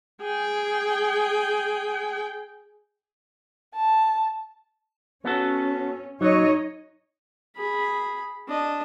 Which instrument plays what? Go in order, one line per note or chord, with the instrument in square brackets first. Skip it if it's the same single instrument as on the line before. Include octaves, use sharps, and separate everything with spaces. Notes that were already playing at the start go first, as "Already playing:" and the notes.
[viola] G#4 G5
[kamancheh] A5
[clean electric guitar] B3 F#4 A4 [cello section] C#4
[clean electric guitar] F#3 [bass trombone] D#4 [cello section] C#5 D#5
[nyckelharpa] G#4 B5
D4 D#5